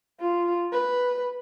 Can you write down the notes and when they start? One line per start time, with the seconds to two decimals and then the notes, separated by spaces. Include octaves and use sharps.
0.21 F4
0.73 B4